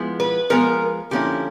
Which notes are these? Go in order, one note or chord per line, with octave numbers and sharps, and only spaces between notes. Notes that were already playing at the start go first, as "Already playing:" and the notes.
Already playing: F3 G#3 B3 E4
B4
F3 G#3 B3 A#4
D3 F3 A#3 C#4 E4 G4